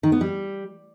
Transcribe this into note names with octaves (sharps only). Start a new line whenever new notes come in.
D#3
B3
G3